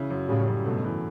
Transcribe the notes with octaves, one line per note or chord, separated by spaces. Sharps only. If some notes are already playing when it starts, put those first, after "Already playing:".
Already playing: C#3 E4
F#2
A2 C#3 G3
F#2
G2 B2 A3
E3